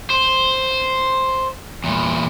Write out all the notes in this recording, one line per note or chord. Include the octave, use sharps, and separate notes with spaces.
C5
E2 A#2